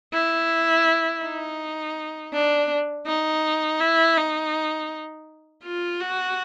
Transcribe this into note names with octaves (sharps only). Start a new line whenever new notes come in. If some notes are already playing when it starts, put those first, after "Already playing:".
E4
D#4
D4
D#4
E4
D#4
F4
F#4